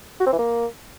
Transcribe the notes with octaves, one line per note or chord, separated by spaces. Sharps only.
F#4
C4
E3
A#3